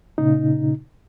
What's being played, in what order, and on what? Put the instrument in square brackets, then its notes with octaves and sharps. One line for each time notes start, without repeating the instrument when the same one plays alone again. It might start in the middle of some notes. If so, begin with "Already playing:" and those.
[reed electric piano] A#2 C#3 D#4